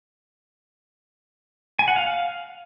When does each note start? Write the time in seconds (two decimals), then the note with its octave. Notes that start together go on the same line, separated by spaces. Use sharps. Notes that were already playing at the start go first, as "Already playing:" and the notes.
1.79 G#5
1.88 F#5
1.96 F5